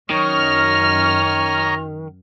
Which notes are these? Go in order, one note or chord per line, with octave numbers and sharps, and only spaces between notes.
F#2 D#3 C#5 D#5 A#5 C#6 F6